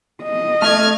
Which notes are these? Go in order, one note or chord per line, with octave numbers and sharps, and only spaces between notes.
D#5
A3 F6 G#6